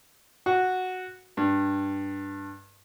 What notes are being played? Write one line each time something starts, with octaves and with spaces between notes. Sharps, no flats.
F#4
G2